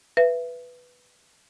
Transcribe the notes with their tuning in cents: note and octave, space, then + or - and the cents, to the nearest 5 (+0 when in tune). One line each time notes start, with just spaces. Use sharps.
B4 +0 E5 +25